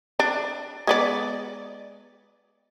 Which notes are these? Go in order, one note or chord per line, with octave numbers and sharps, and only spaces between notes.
D4
G#3 B3 D5